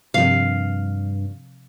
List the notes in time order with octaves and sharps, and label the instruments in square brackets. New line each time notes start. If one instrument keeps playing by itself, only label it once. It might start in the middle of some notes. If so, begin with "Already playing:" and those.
[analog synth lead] G2 [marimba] C3 F3 C4 [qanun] F5